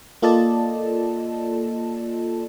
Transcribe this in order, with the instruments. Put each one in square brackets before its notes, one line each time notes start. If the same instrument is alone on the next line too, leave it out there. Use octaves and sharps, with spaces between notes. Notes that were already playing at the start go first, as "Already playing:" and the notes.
[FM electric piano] A#3 F4 A4 D5 D#5 A5